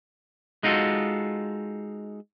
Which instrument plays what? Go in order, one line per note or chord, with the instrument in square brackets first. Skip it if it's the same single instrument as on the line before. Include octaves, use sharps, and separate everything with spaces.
[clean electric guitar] G#3 D#4 F4 F#4 A4